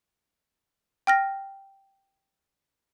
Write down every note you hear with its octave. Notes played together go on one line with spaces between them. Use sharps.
G5 F6 A#6